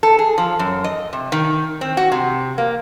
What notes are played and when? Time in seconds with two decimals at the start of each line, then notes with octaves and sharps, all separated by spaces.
0.03 A4
0.19 G#4
0.38 F3
0.59 F#2
0.84 D#5
1.13 C3
1.32 D#3
1.81 C4
1.97 F#4
2.12 C3
2.58 A#3